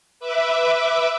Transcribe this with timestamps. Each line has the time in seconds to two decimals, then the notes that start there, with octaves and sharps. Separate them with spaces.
0.20 B4 E5 D6